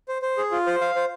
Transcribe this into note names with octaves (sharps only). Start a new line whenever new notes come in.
C5
C5
G#4
F4
C5
F5
C5